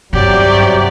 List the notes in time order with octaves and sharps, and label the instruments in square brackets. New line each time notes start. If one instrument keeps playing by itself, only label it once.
[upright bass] G2 [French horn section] C3 F#3 F#4 [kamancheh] G4 D5